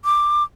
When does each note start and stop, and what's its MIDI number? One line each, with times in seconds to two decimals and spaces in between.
0.05 0.43 86